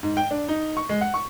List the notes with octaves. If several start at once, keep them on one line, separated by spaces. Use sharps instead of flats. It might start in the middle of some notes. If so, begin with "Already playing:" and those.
G#2
G5
D4
D#4
C#6
G#3
F#5
C#6